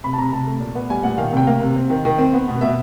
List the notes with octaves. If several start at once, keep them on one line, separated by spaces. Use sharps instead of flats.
C3 B5
A5
C3 A#5
C3 A5
A3
A#2
B3
G3 G#5
A#2 F#5
D#3 F5
C3 G5
A#3 F5
C3
C4
D#3
D#3
C4
B3
B2
B2 E5